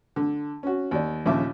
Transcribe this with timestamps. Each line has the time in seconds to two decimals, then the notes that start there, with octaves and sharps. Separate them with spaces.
0.16 D3
0.63 C#4 F#4
0.91 D#2 D5
1.26 A#1 D#2 C#3 E5 D6